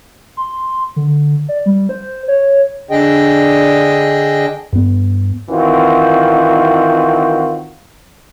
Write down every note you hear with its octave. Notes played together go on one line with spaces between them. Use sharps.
C6
D3
D5
G3
C5
C#5
D3 D4 G#4 D#5 G5
G2 B3
D#3 E3 C4 F4 F#4